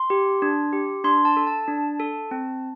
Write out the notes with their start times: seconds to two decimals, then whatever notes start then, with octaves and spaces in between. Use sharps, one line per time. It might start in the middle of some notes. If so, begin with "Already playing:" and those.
Already playing: C6
0.10 G4
0.42 D4
0.73 G4
1.04 D4 C6
1.25 A5
1.37 A4
1.47 A5
1.68 D4
2.00 A4
2.31 C4